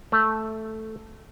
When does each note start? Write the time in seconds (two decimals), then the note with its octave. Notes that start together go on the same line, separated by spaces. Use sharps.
0.12 A3